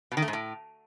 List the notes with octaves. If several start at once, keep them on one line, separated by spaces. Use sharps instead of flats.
B2
D#3
A3
G#2
A2